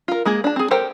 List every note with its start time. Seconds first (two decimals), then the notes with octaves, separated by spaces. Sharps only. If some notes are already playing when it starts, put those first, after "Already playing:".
0.08 F4 A#4
0.25 G#3 A#3 G#4
0.44 D4 A5
0.56 C4 G#4
0.71 G4 A4 A#4 C5 G5